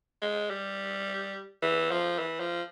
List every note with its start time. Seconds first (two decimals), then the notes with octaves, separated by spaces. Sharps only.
0.22 G#3
0.50 G3
1.62 E3
1.91 F3
2.19 E3
2.40 F3